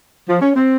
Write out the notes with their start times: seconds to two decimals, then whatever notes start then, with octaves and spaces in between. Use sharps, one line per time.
0.28 F3
0.41 C#4
0.56 C4